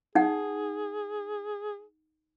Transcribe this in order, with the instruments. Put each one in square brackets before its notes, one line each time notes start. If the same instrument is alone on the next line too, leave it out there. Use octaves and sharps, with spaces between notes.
[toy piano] D#4 F#5 [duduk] G#4